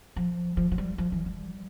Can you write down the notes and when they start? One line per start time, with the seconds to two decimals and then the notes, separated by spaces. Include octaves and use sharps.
0.16 F3
0.57 F3
0.72 F3
0.78 G3
0.98 F3
1.12 E3
1.26 G3